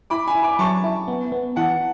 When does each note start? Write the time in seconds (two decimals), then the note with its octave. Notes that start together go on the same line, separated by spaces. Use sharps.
0.10 E4 B5 D6
0.27 G#5 B5
0.35 E4
0.43 B5 D6
0.59 F#3 A5 C#6
0.84 E4
1.08 B3
1.32 B3
1.56 E3 F#5 A5